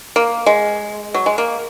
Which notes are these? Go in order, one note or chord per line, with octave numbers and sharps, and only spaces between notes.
A#3
G#3
F#3
G#3
A#3